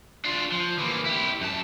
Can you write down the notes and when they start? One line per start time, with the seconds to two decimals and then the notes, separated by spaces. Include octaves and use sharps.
0.25 D4 F4
0.52 F3
0.78 E3 A#3
1.05 E4 G4
1.41 F#2 A5